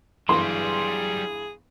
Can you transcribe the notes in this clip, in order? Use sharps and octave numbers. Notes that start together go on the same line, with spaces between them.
G1 G2 E3 F#3 G3 G#4 C6